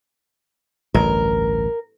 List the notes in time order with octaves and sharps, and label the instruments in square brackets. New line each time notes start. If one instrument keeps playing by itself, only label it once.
[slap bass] A1 D2 G2 [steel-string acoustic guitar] A#4